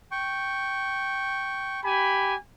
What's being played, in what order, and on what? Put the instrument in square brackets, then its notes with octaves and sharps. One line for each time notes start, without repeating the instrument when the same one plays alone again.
[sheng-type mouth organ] G5 C#6
[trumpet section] G4 G#5 B5